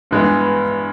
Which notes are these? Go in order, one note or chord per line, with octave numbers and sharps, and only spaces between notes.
G2 E3 G#3 B3 E4